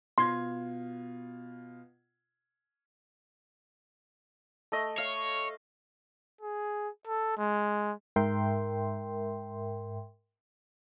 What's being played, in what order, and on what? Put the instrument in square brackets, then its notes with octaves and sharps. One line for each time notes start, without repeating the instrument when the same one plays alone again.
[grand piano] B2 F4 G#6 [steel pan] C6
[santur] A3 D#5
[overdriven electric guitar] C#5 [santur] F5
[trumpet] G#4
A4
G#3
[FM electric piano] G#2 A#4 E5 G5 C6